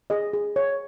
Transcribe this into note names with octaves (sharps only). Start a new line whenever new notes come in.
G#4 D#5
G#4
C#5